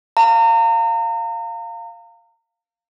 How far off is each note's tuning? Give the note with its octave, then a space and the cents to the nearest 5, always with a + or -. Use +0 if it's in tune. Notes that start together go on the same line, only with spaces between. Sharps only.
F5 +0 A#5 -35